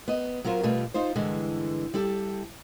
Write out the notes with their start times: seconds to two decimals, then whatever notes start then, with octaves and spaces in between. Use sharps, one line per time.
0.08 B3 D#5
0.44 F#3 B3 F4 A#4 C5
0.63 B2 G3 A3 F4 B4
0.94 D#4 F4 C5
1.15 G2 D3 E3 G#3
1.94 G3 E4 G4 A4